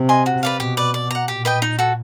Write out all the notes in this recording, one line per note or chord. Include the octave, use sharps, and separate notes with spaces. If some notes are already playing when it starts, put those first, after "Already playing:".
Already playing: C3
D#5 G#5 C6
F#4
B4 D5 F5
B2 G4
B4 D5
D5
F#5 A#5
A#2 G4
B4 D#5 G5
D#4
F#4 A4